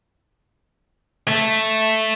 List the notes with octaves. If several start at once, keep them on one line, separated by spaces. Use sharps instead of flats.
A3